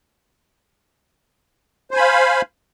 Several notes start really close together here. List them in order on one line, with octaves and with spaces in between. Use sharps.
C5 G#5 B5 F5